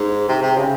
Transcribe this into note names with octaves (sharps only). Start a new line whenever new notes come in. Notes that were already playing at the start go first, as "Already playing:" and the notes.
Already playing: G#2
C3
C3
C#3